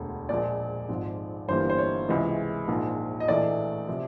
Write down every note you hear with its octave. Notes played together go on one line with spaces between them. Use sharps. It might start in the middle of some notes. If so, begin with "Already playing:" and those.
Already playing: E1 D2 D3
A#1 A#2 F3 G#3 D5
G#1 G#2 F3
G1 G2 E3 G3 A#3 C5
C5
C#5
C#2 C3 E3 G#3
A#1 G#2 F3 A#3
D#5
A#1 A2 E3 A3 D5
C3 F3